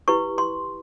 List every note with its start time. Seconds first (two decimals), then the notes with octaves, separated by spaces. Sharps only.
0.08 E4 G4 B4 C#6
0.38 C6